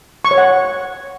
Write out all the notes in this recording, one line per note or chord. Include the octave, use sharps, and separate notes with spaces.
C#6
C#5
F#5